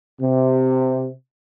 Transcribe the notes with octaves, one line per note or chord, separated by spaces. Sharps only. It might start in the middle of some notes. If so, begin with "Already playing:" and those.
C3